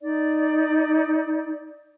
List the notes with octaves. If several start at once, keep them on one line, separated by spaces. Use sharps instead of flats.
D#4 D5